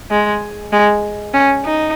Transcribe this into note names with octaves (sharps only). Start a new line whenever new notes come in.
G#3
G#3
C#4
D#4